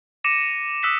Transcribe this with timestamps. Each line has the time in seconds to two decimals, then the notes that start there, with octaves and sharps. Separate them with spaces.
0.24 D6 A#6 C#7 D#7 E7
0.83 D#6 E6 F#6 B6 E7